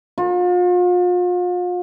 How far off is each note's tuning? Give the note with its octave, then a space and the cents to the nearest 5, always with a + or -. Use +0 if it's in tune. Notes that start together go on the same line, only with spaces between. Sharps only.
F4 +40